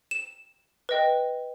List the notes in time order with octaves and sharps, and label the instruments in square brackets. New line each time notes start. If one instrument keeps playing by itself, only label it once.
[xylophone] E7
B4 D#5 G5